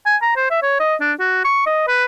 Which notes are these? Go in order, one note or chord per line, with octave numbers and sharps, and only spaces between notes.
G#5
A#5
C5
E5
C#5
D#5
D4
F#4
C#6
D#5
B4